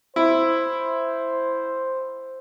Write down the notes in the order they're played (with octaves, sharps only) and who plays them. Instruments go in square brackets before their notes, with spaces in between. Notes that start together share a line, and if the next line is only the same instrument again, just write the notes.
[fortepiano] E4 [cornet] C5